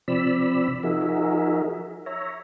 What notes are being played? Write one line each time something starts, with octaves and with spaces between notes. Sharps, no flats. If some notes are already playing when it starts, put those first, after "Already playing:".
C3 F3 C4 D5 B5 E6
F3 D#4 F#4 G#4 A#4 E5
C#5 E5 A#5